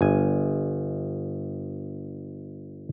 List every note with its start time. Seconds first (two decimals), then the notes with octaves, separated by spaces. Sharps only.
0.01 G1 G#5